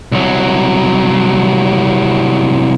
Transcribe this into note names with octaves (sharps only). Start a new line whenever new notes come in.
C2 F#3